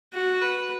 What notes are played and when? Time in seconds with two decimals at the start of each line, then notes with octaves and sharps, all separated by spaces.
0.14 F#4
0.42 B4